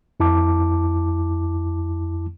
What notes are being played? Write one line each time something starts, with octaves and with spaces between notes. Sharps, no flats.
F2 E4 A5 D6